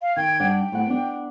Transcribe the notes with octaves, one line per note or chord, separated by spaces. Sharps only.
F5
D#3 G5 G#6
G2 D4 F#5
G5
A2 F#5
B3 D4